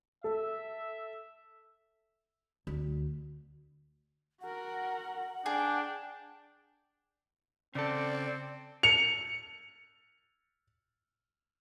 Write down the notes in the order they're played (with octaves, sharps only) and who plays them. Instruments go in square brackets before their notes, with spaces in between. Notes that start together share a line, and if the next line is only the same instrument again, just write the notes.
[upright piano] A4 [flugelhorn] E5
[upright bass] D2
[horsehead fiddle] F#4 A#4 [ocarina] F#5
[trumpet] D4 [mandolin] G#4 [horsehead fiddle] G5
[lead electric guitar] C#3 A4 [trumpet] C4 [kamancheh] D5
[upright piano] C#7 F7